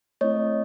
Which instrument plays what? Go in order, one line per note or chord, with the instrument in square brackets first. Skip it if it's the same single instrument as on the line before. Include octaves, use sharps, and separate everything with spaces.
[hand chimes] A3 C4 E4 C#5 D#5